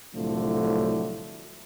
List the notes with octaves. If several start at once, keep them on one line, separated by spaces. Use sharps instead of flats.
C2 A2 D3 F3 F#3 A3